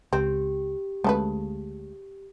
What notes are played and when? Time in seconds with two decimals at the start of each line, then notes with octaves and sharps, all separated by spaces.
0.13 C#2 C4 G4
1.04 D2 C#3 G#3 A3 A4 B4